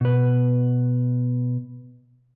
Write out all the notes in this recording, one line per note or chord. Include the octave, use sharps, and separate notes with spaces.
B2 B4